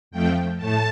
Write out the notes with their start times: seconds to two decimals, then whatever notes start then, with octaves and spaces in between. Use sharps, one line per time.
0.11 F2 F3 A3 G5
0.57 A2 A3 A5